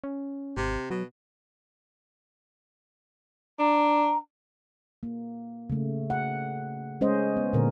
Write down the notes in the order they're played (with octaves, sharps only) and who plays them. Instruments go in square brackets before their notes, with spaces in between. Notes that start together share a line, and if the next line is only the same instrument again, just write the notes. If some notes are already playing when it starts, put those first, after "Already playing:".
[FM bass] C#4
[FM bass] G#1 [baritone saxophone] C3
[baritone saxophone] B2 [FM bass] F#3
[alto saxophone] D4 [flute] A#5
[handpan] A#3
C#3 A3
F#5
G#3 C#4 C5 D#5
B3
A#2 D3 A#4